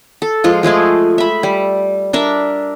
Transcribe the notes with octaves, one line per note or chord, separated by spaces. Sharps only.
A4
F3 G#3 F4
F3 G#3 A3 G#4
E5 B5
G3
D4 A#4 E5